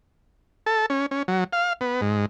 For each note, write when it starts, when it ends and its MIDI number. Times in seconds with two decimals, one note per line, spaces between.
0.66 0.86 69
0.90 1.06 61
1.11 1.23 61
1.28 1.44 54
1.53 1.73 77
1.81 2.01 59
2.01 2.25 44